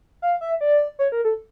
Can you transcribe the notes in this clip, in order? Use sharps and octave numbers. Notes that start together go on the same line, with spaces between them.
F5
E5
D5
C#5
A#4
A4